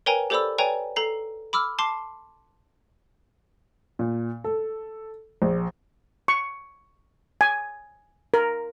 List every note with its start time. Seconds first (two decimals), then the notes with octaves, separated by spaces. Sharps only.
0.06 A#4 B4 C#5 G5 G#5 A#5
0.30 G4 A4 C5 D5 B5 E6
0.58 B4 C#5 D5 G5 G#5 A#5
0.96 A4 A#5 C7
1.53 B5 D6 E6 F6
1.79 A5 C6 D6 C7 E7
3.99 A#2
4.44 A4
5.42 A#1
6.28 C#6
7.41 G#5
8.34 A#4